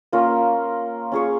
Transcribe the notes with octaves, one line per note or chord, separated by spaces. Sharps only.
A#3 C#4 F4 A#4
C#4 F4 G#4 C#5